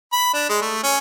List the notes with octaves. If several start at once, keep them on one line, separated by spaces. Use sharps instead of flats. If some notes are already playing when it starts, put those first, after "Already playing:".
B5
D4
G#3
A3
C#4